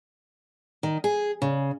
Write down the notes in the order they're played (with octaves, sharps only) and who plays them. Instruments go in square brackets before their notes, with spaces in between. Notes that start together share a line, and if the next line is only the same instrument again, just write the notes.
[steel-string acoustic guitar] D#3
G#4
C#3